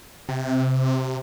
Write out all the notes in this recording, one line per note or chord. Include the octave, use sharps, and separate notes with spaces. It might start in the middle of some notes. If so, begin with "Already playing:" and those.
C3